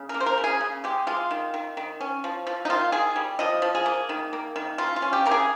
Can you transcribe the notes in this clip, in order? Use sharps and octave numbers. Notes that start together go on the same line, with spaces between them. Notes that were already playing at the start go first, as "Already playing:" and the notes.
Already playing: C#3
A#4
A#3
C5
A#4
C#3
G#4
C#3
G#3 G4
G#3 F4
D#3
D#3
D#3
C#4
F3
F3
D#4
D#3 F4
D#3 G#4
G3
F3 D#5
F3
G#4
A#3
D#3
A#3
D#3
C#3 F4
F4
C#4
G4
C#3 A#4
G#4